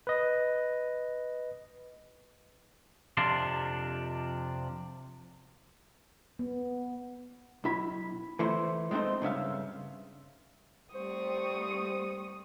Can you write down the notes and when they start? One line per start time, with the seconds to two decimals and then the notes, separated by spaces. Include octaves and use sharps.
0.07 B4 D#5
3.17 F2 C3 F3 D4 C6
6.39 B3
7.64 B1 E4 B5
8.39 E3 A3 E4 C5
8.91 G#3 A3 C4 D#4 C5
9.21 G2 C#3 E5 F5
10.95 G3 A3 C4 C5 C#6 D#6